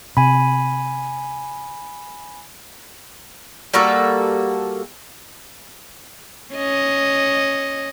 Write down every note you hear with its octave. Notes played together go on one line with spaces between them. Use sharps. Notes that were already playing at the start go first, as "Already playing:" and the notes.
C3 G#5 B5
G3 A#3 F#4 A4
C#4 D#5